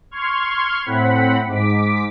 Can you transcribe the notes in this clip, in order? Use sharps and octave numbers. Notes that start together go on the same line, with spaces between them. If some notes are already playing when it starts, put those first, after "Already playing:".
C6 C#6 F6 G#6
A2 C4 F#5 B5
G#2 D6 B6